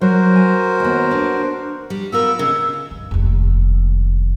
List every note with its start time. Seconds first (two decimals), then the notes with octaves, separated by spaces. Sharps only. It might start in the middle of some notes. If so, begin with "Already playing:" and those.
0.01 F#3 F#4 A#4 C5
0.36 G#5
0.80 D#2 B3
1.11 D4
1.90 G3
2.12 B3 F4 A#4 E6
2.39 C#3 D#4
2.91 G2
3.11 F1 D#2